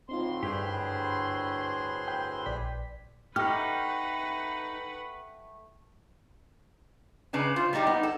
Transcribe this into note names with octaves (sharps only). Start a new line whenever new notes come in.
D2 A2 C4 D#4 F4 C6
G2 D4 G4 G#4 B4 C5
G5
A#1 D5 B6
A3 D#4 G4 B4 F#5 G5 F6
C#3 D4 B4 G#5
F4 C5
G3 D4 D#4 F#4 G4
B3 D#4
A4